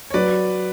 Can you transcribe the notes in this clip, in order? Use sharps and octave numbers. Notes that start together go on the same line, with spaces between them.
C#5
F#3 B4 D5